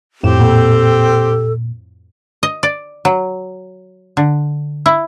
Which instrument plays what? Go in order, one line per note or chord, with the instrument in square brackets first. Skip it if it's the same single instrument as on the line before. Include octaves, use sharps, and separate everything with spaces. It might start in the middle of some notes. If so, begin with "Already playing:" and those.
[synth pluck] F2 A2 E7 [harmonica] C4 G4
[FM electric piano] A#2 [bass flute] A4
[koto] D#5
D5
F#3
D3
E4